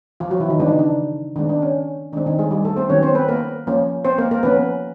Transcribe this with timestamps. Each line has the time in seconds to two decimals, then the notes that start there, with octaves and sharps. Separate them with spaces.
0.20 F3 F4
0.30 F#3 F#4
0.40 E3 E4
0.49 D#3 D#4
0.59 C#3 E3 G#3 B3 D4
0.68 D#4
0.79 D4
1.36 D#3 G#3 B3 D4
1.49 D4
1.62 C#4
2.13 D#3 G#3 C4 D4
2.26 D#3 D#4
2.39 G#3 G#4
2.51 G3 G4
2.65 A3 A4
2.76 C4 C5
2.89 D#3 F#3 B3 C#4 C#5
3.03 C4 C5
3.15 B3 B4
3.28 A#3 A#4
3.67 F3 A#3 C#4
4.05 C4 C5
4.18 A#3 A#4
4.31 A#3 A#4
4.43 F3 A#3 B3 C#4 B4